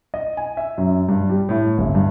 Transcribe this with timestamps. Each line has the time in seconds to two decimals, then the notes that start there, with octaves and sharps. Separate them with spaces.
0.14 D#5
0.37 G#5
0.57 E5
0.78 F#2
1.08 G2
1.29 G3
1.49 A2
1.78 G1
1.95 G2